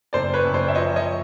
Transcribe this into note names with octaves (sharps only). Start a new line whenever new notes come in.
F#1 C5 D5
B4 C#5
F#1
C5 D5
E5
F3 C#5 D#5
C#5 D#5
F3